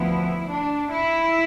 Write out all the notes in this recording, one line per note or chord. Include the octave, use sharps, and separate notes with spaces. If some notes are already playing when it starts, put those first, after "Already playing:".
Already playing: D2 F3 B3 E4
D4
E4